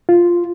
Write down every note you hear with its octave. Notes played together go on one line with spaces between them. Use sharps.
F4